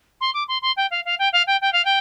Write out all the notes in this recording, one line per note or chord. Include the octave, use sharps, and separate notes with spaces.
C6
D6
C6
C6
G5
F5
F5
G5
F5
G5
G5
F5
G5